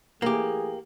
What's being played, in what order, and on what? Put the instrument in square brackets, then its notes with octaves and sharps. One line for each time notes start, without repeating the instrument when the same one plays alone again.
[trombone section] E3 A3 G#4 [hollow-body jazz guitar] A#3 G4